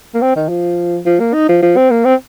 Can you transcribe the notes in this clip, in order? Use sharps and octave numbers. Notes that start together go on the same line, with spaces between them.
A#3
C4
D#3
F3
F3
A#3
D#4
F3
F3
C4
A#3
C4